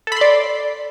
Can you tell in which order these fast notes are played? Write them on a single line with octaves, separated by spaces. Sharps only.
A4 B5 C6 D5